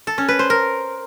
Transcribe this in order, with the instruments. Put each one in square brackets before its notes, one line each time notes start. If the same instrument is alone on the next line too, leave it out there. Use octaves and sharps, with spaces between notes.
[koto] A4
C#4
B4
C5
A#4